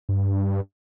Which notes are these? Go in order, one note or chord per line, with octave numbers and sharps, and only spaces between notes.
G2